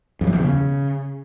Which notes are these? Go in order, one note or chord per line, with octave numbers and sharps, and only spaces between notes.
F2
F#2
E2
C3
C#3